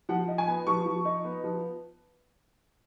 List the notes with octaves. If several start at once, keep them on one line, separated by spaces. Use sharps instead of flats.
F3 F#5
D#4
G#5
B3
F3 C#6
F3
D#4
B3
F3